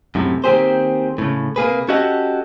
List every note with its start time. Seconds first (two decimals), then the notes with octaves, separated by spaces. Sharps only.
0.15 F#2 A2 C3
0.44 D#3 A#3 C4 G4 G#4 C5
1.18 A2 C#3
1.56 C3 A#3 G#4 B4
1.89 C#4 F#4 G4 A4 D#5 F#5